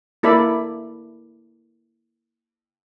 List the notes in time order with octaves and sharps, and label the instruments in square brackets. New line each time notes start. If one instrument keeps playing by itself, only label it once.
[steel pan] A#3 E4 A4 D5 B5